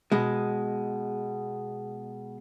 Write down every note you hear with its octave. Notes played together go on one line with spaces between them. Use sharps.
B2 G#3